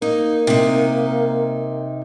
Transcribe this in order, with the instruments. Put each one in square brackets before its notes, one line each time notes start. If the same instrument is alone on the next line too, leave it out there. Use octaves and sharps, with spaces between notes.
[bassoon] A#3 [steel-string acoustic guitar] D#4
[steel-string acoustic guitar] C3 D#4